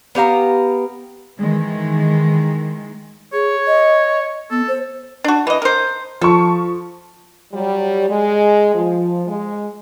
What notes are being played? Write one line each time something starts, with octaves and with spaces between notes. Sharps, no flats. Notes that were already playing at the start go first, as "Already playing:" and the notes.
B3 G4 F5 A#5
D#3 E3 G#3
G#4 C#5
D#5
B3 A4
C5
D4 F#4
E3 D#5
A#4 C5
F3 A4 C#6
F#3 G3
G#3
F3
G#3